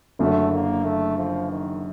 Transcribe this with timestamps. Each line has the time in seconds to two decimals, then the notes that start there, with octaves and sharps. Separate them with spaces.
0.19 F#1 F#2 D3 A3
0.52 A#3
0.84 A3
1.18 F3
1.50 D#3